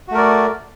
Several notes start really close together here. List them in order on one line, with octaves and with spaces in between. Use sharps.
F#4 A3 A#4 D5